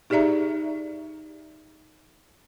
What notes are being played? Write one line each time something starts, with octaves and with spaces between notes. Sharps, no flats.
D#4 G4 G#4 D5 E5 A#5